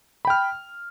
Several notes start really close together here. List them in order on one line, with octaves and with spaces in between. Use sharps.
B5 G5 F6